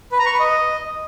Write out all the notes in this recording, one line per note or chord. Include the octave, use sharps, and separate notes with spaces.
B4
A#5
C#6
B4
D#5